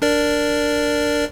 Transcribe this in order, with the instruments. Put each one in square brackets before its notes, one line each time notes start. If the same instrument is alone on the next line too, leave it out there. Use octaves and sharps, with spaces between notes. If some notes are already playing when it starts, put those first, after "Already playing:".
[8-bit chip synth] D4 A#4 D5